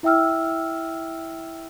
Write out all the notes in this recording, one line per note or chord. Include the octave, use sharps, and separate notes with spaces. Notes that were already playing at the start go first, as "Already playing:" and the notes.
E4 E5 G5 E6 F6